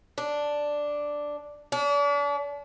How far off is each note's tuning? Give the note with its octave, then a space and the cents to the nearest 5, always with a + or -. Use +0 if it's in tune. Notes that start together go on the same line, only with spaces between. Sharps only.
D4 +0
D4 -40